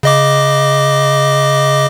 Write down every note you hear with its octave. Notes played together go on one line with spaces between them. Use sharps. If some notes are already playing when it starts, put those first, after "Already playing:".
C#3 D#5 D6